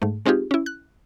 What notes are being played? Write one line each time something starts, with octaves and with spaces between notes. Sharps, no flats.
G#2 A3
G#3 C4 D#4 F4 G4 G#4
C#4 E4
F#6